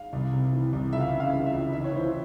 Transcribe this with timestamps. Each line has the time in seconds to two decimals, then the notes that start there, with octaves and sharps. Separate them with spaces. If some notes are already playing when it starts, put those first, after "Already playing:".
Already playing: F5
0.13 C2
0.32 C3
0.53 E3
0.73 C2
0.92 C#2 E5
1.00 F5
1.09 C#3 E5
1.20 F5
1.33 E3
1.46 E5
1.53 C#2
1.72 E3 E5
1.84 C#5
1.92 E3 C5
2.08 C#5